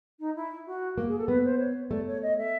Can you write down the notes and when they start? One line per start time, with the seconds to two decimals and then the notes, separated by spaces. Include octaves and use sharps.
0.19 D#4
0.35 E4
0.66 F#4
0.98 A#3
1.08 G#4
1.18 A4
1.28 B3 B4
1.44 C5
1.59 C#5
1.90 A3 D5
2.07 C#5
2.22 D#5
2.38 E5